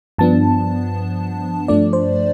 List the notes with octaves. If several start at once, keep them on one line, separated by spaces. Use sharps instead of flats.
G2 F3 B3 D4 A5
G2 F3 A3 D4 D5
C5